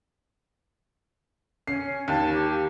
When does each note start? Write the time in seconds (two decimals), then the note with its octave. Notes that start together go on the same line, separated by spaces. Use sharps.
1.68 C#4 C7
2.08 D#2 A5
2.32 G4